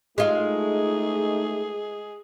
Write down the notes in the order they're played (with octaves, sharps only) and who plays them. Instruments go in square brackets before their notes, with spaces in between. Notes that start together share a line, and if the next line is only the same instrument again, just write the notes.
[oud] G#3 F4 [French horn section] A3 D#4 [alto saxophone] G#4